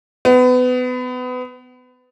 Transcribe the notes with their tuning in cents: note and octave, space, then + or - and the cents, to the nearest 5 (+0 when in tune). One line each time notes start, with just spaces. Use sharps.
B3 +30